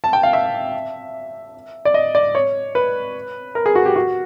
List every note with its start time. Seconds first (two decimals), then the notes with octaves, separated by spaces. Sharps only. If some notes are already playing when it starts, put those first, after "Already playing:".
0.04 A5
0.13 G5
0.23 F5
0.33 E5
1.85 D5
1.94 D#5
2.15 D5
2.35 C#5
2.75 B4
3.55 A#4
3.66 G#4
3.75 F#4
3.86 G4
3.96 F#4